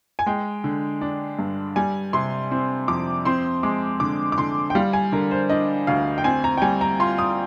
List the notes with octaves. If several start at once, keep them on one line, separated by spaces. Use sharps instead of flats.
G#5
G#3 G5
D3
D4
G2
G3 G#5
C3 C6
C4
F2 D6
C4 C6
G#3 D6
D3 D6
D6
D3 C6
G5
G3 F5
G#5
D3 A#4
C5
D4 D#5
D2 F5
G5
C4 G#5
A#5
G5
G3 G#5
A#5
F4 C6
D#6